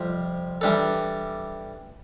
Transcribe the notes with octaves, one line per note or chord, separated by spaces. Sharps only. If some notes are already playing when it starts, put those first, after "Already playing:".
Already playing: F2 C3 G3
E3 G3 D4 A4